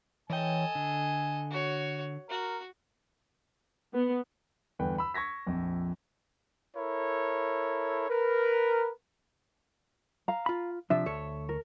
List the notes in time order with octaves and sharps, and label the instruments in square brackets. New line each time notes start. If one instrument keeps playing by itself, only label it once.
[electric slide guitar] E3 C#5 G5 [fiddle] A4 D#5 [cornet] G#5
[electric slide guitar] D3
[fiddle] F#4 C#5
[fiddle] F#4 [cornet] A#4
[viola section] B3
[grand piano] E2 G2 D3 B4 G5
B5 E6
C#6 G#6 A#6 B6
A#1 F2
[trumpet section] E4 A4 A#4 C#5
A#4 B4
[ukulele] F5 A#5
[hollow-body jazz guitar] F4 B5
[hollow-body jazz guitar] C3 F3 D4 [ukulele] E5
[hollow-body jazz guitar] D2 A4 C#5
[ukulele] A#4